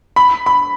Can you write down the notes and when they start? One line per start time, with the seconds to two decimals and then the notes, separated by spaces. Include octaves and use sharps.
0.16 B5
0.46 B5